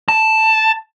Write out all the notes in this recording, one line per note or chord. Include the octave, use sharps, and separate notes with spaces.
A5